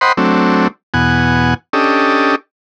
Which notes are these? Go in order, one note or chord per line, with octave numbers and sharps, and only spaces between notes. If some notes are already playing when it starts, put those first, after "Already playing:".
C5 D#5 F#5 G5 B5 C6
F#3 A3 C4 D4
E2 B2 F#5 G#5
C#4 D4 G4 A4 D#5